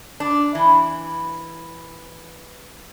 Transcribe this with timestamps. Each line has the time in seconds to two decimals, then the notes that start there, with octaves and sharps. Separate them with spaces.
0.20 D4
0.55 E3